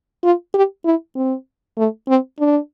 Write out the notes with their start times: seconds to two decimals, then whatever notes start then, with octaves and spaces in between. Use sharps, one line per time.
0.24 F4
0.54 G4
0.85 E4
1.16 C4
1.78 A3
2.09 C4
2.39 D4